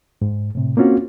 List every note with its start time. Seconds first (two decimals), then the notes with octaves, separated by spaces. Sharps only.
0.22 G#2
0.55 A2 C3
0.77 A#3 C4 C#4 F4 F#4